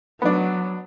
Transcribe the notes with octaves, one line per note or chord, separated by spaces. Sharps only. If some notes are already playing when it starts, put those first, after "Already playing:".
F#3 B3 D4